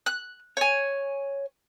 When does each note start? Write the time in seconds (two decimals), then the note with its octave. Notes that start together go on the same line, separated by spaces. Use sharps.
0.06 F#6
0.57 C#5 G#5